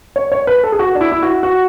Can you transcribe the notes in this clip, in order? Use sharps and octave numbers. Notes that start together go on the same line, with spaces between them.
C#5
C#5
B4
A4
G#4
F#4
D4
E4
E4
F#4
F#4